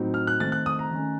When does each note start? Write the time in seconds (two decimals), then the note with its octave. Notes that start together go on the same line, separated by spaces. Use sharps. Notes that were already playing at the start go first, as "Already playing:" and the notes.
Already playing: A2 F#3 C4 D#4
0.14 F6
0.27 F#6
0.40 D#3 A3 C4 A6
0.52 F#6
0.66 D#6
0.79 A#5
0.91 D#3 A3 C#4